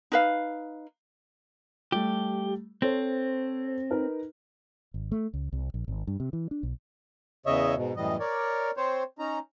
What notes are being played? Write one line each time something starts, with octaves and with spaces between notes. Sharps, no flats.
D#4 B4 F5
G3 A3 G4
C4 A4 C5 C#5
D#4 A#4 B4
G#1
A3
C#2
C2
A#1
G#1
G2
C3
E3
D4
B1
E2 C#3 C#5 D#5 E5
G#2 B2
F#2 A2 E3 G3 D#5
A#4 C#5 D5
C4 C5 C#5
C#4 D#4 A#5